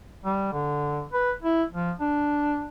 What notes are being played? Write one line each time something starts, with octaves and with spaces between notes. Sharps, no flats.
G3
D3
B4
E4
F3
D4